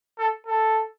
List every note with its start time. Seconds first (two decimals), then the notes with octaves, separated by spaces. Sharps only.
0.19 A4
0.47 A4